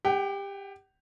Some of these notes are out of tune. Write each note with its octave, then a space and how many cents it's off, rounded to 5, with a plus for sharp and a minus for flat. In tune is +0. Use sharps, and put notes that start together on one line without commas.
G4 +20 G5 -45